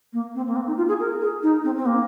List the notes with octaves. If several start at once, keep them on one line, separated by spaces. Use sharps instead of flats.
A#3
C4
A#3
C4
D#4
F4
G#4
A#4
G#4
D#4
C4
C4
A#3